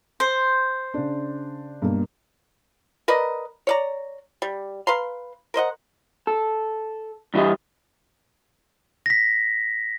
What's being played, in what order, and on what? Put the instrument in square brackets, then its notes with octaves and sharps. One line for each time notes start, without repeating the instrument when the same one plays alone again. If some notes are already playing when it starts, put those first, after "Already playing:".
[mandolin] C5
[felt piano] C#3 D4
G2 B2 A#3
[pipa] A#4 B4 D5 D#5
C#5 D5 A#5
G3
B4 F5 A#5 C6
A#4 C5 D#5 F#5
[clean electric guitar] A4
G2 E3 E4 G4 D#5
[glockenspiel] A#6 B6